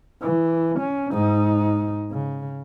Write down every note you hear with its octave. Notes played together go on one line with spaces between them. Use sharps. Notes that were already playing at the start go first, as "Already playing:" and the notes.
E3
C#4
G#2 D#4
C#3